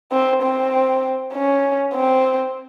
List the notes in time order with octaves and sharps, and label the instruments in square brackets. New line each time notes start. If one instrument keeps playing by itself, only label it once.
[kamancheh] C4
C4
C#4
C4